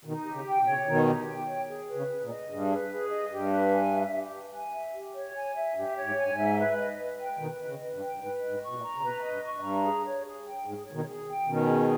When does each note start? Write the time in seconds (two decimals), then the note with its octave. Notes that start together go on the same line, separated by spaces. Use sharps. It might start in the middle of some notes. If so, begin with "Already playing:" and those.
0.04 B2 D#3 D#4
0.24 G4
0.32 C#3
0.45 G5
0.59 B2
0.66 C#3 C#5
0.73 B2
0.86 B2 D#3 D#4
1.06 G4
1.27 G5
1.47 C#5
1.68 G#4
1.89 B4
1.94 C#3
2.09 G#4
2.22 A#2
2.28 D#5
2.49 G2 G#4
2.70 B4
2.90 G#4
3.10 D#5
3.30 G2 G4
3.51 B4
3.71 G#5
3.92 E5
4.13 G4
4.33 B4
4.53 G#5
4.73 E5
4.94 G4
5.14 C#5
5.34 G#5
5.55 E5
5.75 G2 G4
5.96 C#5
6.03 G#2
6.16 G#5
6.23 G2
6.30 G#2
6.37 E5
6.57 B4
6.78 D#5
6.98 B4
7.19 G5
7.39 B2 D#3 B4
7.58 D#5
7.66 C#3
7.80 B4
7.93 G2
8.00 G5
8.16 G2
8.20 G#2 B4
8.40 D#5
8.47 G#2
8.62 C#6
8.68 B2
8.75 A#2
8.82 A#5
8.96 C#3
9.01 B2 B4
9.22 D#5
9.30 G2
9.43 C#6
9.56 G2
9.62 A#5
9.83 G#4
10.04 C#5
10.24 G#4
10.44 G5
10.65 G#2 G#4
10.85 C#5
10.92 B2 D#3
11.06 G#4
11.27 G5
11.46 B2 D#3 C#4
11.66 G#4